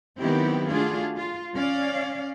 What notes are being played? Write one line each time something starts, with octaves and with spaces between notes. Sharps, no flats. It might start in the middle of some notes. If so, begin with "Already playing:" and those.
D#3 F#3 B3 C4 E4 G4
A3 D4 F4 F#4 G#4
F4
C#4 D5 F5